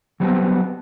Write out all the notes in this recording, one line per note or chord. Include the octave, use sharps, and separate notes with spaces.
F#3 G3 B3 C4 F#4